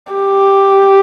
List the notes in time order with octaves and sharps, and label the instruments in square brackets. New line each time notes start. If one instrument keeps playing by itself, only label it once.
[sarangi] G4